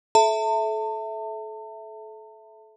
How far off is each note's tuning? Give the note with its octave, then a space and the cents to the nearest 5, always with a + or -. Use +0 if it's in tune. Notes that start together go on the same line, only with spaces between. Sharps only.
A4 -30 E5 +0 A5 +40